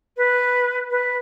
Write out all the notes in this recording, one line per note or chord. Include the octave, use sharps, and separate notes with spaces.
B4
B4